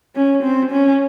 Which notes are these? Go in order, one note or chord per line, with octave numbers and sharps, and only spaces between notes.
C#4
C4
C#4